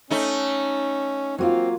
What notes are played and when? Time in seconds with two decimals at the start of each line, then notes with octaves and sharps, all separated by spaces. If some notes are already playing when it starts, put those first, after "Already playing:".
0.11 A3 C#4 D#4
1.38 F#3 A#3 C4 F4